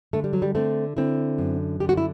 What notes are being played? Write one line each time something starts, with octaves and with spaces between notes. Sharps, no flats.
D3 A3
G3
F#3
G3
D3 A3 C4
D3 C4 E4
F#2
D3 G4
F#4
E4